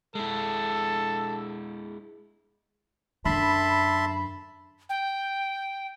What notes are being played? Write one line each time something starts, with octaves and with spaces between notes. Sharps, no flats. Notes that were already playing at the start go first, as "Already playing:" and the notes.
G#3 E4 A4
F#2 D3 E5 A5 B5 C6
G5